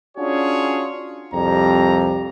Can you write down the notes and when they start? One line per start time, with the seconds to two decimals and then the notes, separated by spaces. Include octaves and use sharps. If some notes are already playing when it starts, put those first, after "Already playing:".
0.18 C#4 D4 F4 F#4 G#4 C#5
1.34 C2 F2 G3 G4 A#5